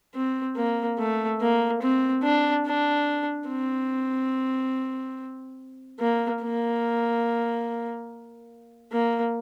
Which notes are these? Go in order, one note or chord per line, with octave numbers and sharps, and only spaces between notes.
C4
A#3
A3
A#3
C4
D4
D4
C4
A#3
A#3
A#3